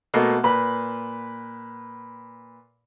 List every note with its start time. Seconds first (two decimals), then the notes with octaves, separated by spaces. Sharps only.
0.14 B2 A3 A#3
0.44 A#2 B4 B5